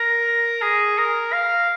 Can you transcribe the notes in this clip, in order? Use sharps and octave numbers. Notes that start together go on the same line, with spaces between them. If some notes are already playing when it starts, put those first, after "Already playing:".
Already playing: A#4
G#4
A#4
F5